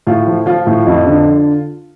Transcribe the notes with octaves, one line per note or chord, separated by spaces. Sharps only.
A2 F4
F3
F3 F4
A2
F2
D3